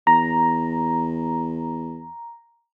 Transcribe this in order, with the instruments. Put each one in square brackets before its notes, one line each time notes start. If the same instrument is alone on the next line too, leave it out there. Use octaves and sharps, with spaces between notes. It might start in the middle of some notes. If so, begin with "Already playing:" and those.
[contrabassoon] E2 [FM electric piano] A#5